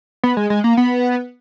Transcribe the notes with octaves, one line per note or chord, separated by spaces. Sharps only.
B3
G#3
G#3
A#3
B3